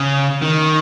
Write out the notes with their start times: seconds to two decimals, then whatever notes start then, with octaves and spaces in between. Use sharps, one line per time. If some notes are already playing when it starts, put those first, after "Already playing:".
Already playing: C#3
0.42 D#3